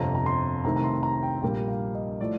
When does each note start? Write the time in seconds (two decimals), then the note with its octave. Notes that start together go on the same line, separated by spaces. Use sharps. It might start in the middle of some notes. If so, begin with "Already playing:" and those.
Already playing: G1 F2 C3 A#5
0.15 A#5
0.26 C6
0.64 C2 C3 D#3 A3 A#5
0.76 A#5
0.84 C6
1.03 A#5
1.23 G5
1.42 A#1 A#2 G3 A#3 G5
1.68 F5
1.95 D#5
2.20 A2 F3 A3 D5